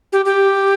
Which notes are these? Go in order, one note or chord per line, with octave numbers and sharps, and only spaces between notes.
G4
G4